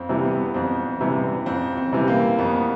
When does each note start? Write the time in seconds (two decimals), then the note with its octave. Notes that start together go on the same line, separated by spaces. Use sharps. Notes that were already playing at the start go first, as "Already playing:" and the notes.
Already playing: F2 C4
0.09 C3 E3 G3
0.25 B3
0.54 F2 C4
1.01 C3 E3 G3
1.46 F2 C4
1.77 C4
1.93 C3 E3 G3
2.08 A#3
2.38 F2 B3